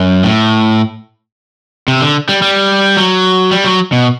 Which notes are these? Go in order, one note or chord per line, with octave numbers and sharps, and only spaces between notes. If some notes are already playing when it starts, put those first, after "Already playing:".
Already playing: F#2
A2
C3
D3
G3
G3
F#3
G3
F#3
B2